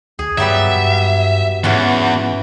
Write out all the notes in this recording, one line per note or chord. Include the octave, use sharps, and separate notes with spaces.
D2 G#4
G2 F#3 G3 B3 E5
G2
E2 G#2 E3 C#4 F#4